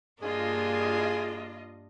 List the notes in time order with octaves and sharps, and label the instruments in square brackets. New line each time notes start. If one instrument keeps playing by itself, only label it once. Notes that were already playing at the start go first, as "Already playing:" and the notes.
[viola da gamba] G2 A#3 D4 [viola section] F4 D#5 [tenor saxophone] G#4